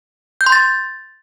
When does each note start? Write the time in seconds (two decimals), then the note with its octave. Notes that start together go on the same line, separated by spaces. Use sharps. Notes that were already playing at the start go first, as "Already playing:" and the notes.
0.41 G6
0.46 C6
0.52 A6